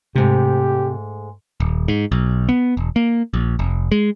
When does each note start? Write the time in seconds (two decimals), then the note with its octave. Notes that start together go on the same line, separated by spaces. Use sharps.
0.16 G#2 C3 A3 G4
1.60 D#1
1.88 G#2
2.12 B1
2.49 B3
2.77 E1
2.96 A#3
3.33 A#1
3.59 F1
3.92 G#3